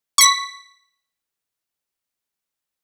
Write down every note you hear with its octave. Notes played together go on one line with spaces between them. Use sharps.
C#6 B6